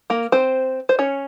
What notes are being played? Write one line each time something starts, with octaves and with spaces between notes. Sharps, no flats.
A#3 A#4
C4 C5
C5
C#4 C#5